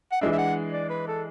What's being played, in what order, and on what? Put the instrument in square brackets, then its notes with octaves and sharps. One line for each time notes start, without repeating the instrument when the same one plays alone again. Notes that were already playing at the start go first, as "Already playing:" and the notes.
[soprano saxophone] F#5
[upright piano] E3 G#3 D4 [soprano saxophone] E5
[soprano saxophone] E5
F#5
D5
B4
A4